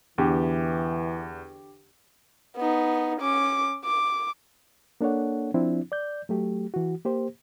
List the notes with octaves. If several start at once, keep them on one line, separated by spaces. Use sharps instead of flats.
E2 D3 E3 G4
B3 D#4
C#4 D6
D6
A#3 D4 A4 C#5 F#5
F3 C4 D4 E4
D5 G6
F#3 A3 G4
E3 F#4
A#3 G4 C5